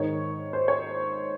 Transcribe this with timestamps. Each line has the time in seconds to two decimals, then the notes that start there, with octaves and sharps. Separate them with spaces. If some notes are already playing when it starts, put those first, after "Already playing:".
Already playing: G#2 D#3 C#5
0.53 C5
0.68 C#5